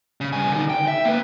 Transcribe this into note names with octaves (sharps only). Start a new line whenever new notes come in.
C#3
G2 G#5
D3 D#4
G5
E5
A#3 B4